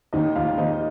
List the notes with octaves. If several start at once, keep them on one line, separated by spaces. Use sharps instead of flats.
D#2 D#4 D#5
D#2 F4 F5
D#2 D#4 D#5